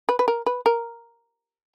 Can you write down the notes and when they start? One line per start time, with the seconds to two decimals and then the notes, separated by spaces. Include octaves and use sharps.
0.09 B4
0.19 B4
0.28 A#4
0.46 B4
0.66 A#4